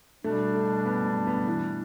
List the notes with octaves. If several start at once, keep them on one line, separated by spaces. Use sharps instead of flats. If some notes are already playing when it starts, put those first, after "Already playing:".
B2 G3 A3 D4
A3
B3
B3
B3
E3